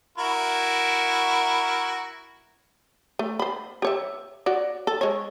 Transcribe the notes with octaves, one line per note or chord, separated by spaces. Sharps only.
E4 F#4 A#4
A3
C5 B5
G4 C#5 E5
F#4 C#5 D5
A4
G#3 C#5